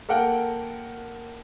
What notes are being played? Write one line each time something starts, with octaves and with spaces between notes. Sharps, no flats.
A#3 A4 A#4 F#5 G5